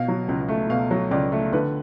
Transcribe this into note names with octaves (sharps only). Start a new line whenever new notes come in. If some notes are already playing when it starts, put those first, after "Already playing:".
Already playing: B2 F5
F#3
C#2
A3
B2 F5
F#3
C#2 D5
A3
D3 B4